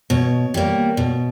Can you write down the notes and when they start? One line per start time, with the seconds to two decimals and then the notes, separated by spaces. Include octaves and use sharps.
0.10 B2 C#5
0.54 G3 A#3
0.97 B2